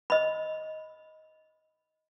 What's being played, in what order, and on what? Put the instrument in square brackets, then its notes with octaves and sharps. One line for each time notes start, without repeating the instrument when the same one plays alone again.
[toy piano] D#5 B5